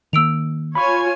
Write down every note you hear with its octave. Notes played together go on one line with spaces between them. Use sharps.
D#3 A#3 E6 D7 F7
F4 C#5 G#5 B5 C#6